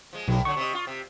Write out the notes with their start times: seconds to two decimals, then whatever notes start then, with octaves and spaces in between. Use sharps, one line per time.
0.13 F3 G#3
0.28 B1 A2 G#3 A#3
0.45 D3 F#3 C#6
0.57 C3 D#5
0.74 F4
0.87 C3